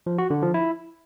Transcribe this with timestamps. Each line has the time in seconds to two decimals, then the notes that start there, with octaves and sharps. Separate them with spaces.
0.07 F3
0.18 F#4
0.30 D3
0.42 F3
0.54 E4